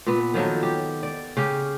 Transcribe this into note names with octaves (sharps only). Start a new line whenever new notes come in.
A#2 B3
D#3 F3 F#3 A4
G4
D5
C#3 C#4 G4